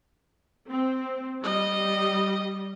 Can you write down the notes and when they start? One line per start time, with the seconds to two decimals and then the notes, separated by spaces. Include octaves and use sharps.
0.69 C4
1.43 G3 D#5